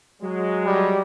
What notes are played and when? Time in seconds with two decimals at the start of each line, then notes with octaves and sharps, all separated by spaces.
0.22 F#3 G#3
0.66 G3